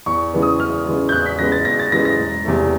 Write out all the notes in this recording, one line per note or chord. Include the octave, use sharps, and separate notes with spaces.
E2 C#6
C#3 E3 G#3 B3
D#6
E2 F6
C#3 E3 G#3 B3
G6
E2 F#6
B6
C#3 E3 G#3 B3 A#6
A6
E2 A#6
A6
C#3 E3 G#3 B3 A#6
A#6
E1
E2 C3 E3 A3